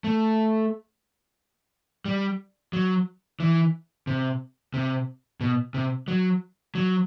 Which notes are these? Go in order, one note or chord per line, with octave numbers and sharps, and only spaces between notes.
A3
G3
F#3
E3
C3
C3
B2
C3
F#3
F#3